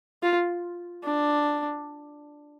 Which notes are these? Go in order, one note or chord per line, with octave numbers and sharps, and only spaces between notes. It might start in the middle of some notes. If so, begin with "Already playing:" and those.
F4
D4